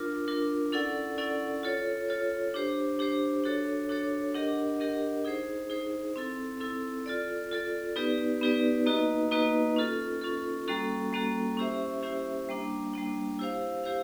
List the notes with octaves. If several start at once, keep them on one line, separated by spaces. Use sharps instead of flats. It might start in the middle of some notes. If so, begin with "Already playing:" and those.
Already playing: D4 F4 A#4
D4 F4 A#4
C#4 E4 A4 D5 F#5
C#4 E4 A4 D5 F#5
F4 A4 C#5
F4 A4 C#5
D4 G4 C5
D4 G4 C5
D4 F#4 A4 C#5
D4 F#4 A4 C#5
D4 G4 A#4 D#5 F#5
D4 G4 A#4 D#5 F#5
D#4 G#4 C5
D#4 G#4 C5
C4 E4 A4
C4 E4 A4
F4 A4 D5
F4 A4 D5
B3 D#4 G4 B4 D5
B3 D#4 G4 B4 D5
A#3 D#4 F#4 B4 D#5
A#3 D#4 F#4 B4 D#5
C#4 F4 A4
C#4 F4 A4
G3 A#3 C#4 F#4 A4
G3 A#3 C#4 F#4 A4
C#4 E4 G4 C5 E5
C#4 E4 G4 C5 E5
G3 A#3 D4
G3 A#3 D4
E4 G4 C5 F5
E4 G4 C5 F5